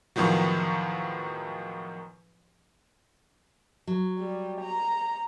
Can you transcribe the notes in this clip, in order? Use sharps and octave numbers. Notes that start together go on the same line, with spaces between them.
E2 A2 D#3 F3 F#3
F#3
G3
A#5